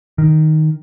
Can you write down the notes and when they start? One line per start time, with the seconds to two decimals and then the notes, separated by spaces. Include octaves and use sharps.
0.18 D#3